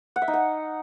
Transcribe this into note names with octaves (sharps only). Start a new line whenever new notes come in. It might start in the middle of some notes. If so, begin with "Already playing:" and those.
F#5
E5
D#4
F#5